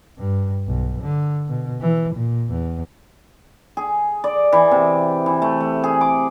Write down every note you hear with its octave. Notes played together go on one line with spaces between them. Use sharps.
G2
B1
D3
B2
E3
A#2
E2
G#4
D5
E3
C3
E3
A3
A3
G#4
D6